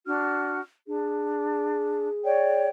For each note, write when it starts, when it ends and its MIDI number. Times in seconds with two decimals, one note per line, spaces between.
0.06 0.60 62
0.06 0.60 66
0.06 0.60 89
0.88 2.08 62
0.88 2.67 68
2.24 2.68 73
2.24 2.68 74
2.24 2.68 79